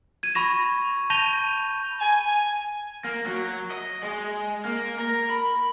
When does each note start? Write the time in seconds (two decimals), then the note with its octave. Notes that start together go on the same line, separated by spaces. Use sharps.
0.23 G#6 D#7
0.35 B5 C#6 A#6 E7
1.10 A5 G6 A#6 D#7 F7 G7
2.00 G#5
3.04 A#3
3.26 F#3
3.71 D#5
4.03 G#3
4.65 A#3
4.99 A#4
5.30 B5